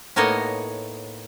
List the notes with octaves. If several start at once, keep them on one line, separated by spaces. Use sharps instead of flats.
A2 A#3 B3 D#4 C#5 D#5